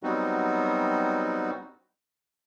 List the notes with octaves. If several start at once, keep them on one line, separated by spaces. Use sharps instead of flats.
F#3 G3 B3 C4 D#4 F#4